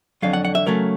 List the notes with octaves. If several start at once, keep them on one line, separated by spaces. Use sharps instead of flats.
F2 D3 F#3 F5
F#5
F#5
E5
C#3 F#3 A3 C#4 A#4